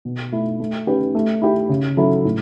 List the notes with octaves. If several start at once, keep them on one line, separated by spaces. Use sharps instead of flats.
B2
A3 E4
A3
C#4 G4 B4
A3
E4 G4
C#3
F#3 C#4 E4 A4
A2